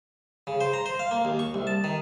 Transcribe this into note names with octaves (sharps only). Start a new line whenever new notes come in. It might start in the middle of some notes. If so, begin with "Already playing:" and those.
C#3
C5
A#5
C5
F5
A#3
D#2
C#6
C2
A5
D#3